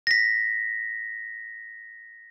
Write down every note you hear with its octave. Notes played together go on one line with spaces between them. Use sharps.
A#6 B6